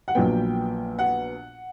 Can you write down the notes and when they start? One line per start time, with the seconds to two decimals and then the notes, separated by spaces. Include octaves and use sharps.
0.08 F#5
0.15 A#1 A#2 F#3 B3 G5
0.99 F#5